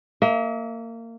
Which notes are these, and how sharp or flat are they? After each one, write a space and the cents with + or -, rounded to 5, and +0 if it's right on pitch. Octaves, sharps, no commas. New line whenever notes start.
A#3 -25 E5 -45